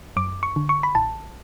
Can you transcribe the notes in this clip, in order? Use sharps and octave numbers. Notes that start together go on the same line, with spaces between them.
F#2 D6
C#6
D3
C#6
B5
A1 A5